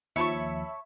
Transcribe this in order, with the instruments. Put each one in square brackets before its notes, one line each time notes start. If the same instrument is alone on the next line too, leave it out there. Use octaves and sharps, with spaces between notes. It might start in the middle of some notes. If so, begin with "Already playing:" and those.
[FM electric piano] D#2 F3 [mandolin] C#5 A5 C#6 [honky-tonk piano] E5 B5